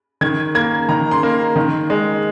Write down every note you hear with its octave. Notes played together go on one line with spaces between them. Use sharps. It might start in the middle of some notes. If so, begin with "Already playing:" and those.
D#3 G#6
A#3 G#6
D#3 A#5
C6
A#3
D#3
G#3